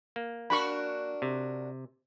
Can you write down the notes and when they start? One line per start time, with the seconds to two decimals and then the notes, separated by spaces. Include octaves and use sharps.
0.16 A#3
0.50 D4 F#4 A#4 B5 C#6
1.22 C3